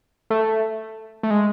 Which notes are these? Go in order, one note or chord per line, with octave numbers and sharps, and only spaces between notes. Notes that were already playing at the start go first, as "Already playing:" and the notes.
A3
A3
G#3